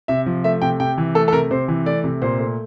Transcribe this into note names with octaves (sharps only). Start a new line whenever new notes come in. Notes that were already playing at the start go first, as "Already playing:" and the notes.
C3 E5
F3
A3 E5
C3 G5
C3 G5
E3
A3 A4
A4
C3 A#4
C3 C5
E3
A3 D5
C3
A#2 C5
A3